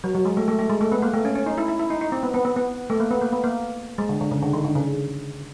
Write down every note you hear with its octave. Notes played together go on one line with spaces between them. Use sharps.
F#3
F#3
G#3
A3
A3
A3
G#3
A3
B3
A#3
A3
C#4
C#4
D#4
E4
E4
E4
D#4
D#4
C4
B3
B3
B3
B3
A3
A#3
B3
A#3
B3
A#3
G#3
D3
D3
C#3
D3
D#3
D3
C#3